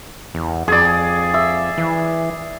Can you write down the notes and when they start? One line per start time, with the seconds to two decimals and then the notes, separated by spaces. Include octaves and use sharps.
0.34 E2
0.68 F2 G#4 D5
1.34 E5
1.78 E3